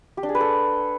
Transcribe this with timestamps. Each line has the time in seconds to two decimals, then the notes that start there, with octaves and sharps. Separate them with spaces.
0.17 G4
0.23 D4
0.29 G#4
0.35 B4
0.40 A4